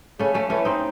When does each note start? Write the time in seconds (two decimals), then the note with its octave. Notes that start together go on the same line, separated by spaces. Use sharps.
0.19 C#3 A3 C#4
0.34 A3 C#4
0.50 E3 A3 C#4
0.65 C4 D#4